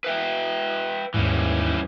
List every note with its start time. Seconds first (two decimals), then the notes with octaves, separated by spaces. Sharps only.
0.04 B4 E5 G5
1.14 D#2 G#2 E3 G3 C#4